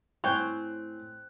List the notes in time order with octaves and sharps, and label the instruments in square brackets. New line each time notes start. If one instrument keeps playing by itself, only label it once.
[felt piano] A2 G#5 F#6 [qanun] C4 C5 [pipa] C#5 G5